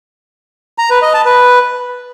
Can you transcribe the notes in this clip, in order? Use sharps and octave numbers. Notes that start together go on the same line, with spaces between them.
A#5
B4
D#5
A5
B4